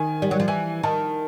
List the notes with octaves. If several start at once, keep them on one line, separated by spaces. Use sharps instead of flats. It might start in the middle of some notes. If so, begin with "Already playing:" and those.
Already playing: D#3 G#5
G3
F#3
F3
E3 G#5
D#3 A5